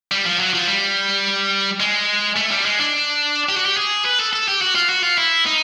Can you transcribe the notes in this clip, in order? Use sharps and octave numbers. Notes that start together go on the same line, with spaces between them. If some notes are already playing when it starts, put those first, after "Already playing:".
G3
F3
F#3
F3
G3
G#3
A3
G3
G#3
D4
G4
F#4
G4
G#4
B4
A4
A4
G4
F#4
F4
F#4
F4
E4
D#4